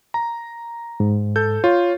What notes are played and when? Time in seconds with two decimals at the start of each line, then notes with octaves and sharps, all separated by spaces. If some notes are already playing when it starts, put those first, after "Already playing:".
0.14 A#5
1.00 G#2
1.36 A4 G6
1.64 F4 C#5